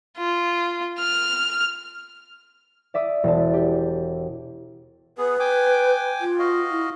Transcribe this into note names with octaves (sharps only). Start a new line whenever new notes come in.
F4
F6
D5 E5 D6 D#6
E1 A5
G4
B3 G#4 B4
G5 G#5 D6
F4
F#4 D#5 F5
E4